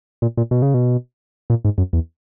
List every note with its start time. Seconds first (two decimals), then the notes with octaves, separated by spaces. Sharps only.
0.22 A#2
0.37 A#2
0.51 B2
0.62 C#3
0.74 B2
1.50 A#2
1.65 G#2
1.78 F#2
1.93 E2